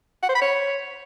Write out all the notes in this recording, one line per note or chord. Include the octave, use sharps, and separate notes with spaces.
F#5
C5
B5
C#5